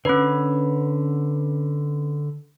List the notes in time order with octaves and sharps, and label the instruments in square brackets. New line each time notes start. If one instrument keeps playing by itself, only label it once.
[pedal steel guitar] D3 C#5 B5 [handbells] C#4 B4